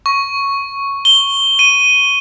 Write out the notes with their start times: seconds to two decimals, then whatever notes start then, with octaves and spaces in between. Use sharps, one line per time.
0.06 C#6
1.05 G7
1.59 D#7